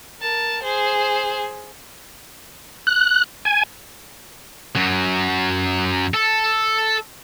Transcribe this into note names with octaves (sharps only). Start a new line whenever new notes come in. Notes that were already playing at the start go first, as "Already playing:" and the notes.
A#4 A5
G#4 C5
F#6
G#5
F#2 F#3
A4